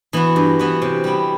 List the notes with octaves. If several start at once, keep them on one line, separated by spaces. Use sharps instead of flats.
E3 B3 F#4
G2
E3 B3 F#4
C3
G3 B3 E4